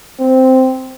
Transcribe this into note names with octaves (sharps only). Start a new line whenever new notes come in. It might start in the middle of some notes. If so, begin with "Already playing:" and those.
C4